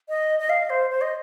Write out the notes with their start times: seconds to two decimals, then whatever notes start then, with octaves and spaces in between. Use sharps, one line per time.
0.09 D#5
0.39 D#5
0.49 F5
0.70 C5
0.90 C5
1.01 D#5